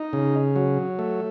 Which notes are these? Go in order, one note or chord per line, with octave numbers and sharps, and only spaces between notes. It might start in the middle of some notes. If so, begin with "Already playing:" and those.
Already playing: D#4
C#3
F#3
A3